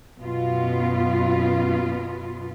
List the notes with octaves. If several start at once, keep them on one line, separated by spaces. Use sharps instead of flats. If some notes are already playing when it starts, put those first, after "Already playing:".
F#2 B2 B3 F4